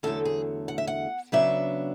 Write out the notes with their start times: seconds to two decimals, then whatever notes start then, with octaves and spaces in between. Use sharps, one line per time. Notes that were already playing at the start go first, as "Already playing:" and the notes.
0.03 E2 D3 F#3 A3 A4
0.25 G#4
0.68 F#5
0.78 E5
0.87 F#5
1.32 C#3 F#3 B3 D4 E5